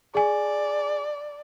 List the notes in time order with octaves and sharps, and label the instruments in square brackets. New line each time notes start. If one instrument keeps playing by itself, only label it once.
[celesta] G#4 G#5 [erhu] D5